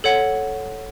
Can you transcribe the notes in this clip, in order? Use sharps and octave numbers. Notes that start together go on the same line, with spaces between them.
A4 C#5 F#5